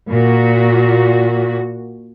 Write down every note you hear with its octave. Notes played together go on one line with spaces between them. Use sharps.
A#2 F#4